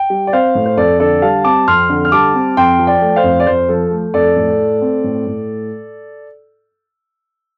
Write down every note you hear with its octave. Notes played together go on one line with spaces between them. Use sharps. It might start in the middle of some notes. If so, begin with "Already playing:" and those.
Already playing: G5
G3
D5
C4 C5 F5
A2
C5
F2 A4 D5
D3 A4 D5
G3 F5 A5
C4 A5 D6
F2 C6 F6
D3
F6
G3 A5 D6
C4
F2 G5 C6
F3
D5 G5
A3
C5 F5
F2
D5
F2 C5
F3 A4
A3
F2 A4 D5
A2
A3
C4
A2
A2